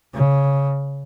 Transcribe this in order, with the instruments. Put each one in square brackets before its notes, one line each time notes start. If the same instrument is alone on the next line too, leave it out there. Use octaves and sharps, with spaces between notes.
[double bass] C#3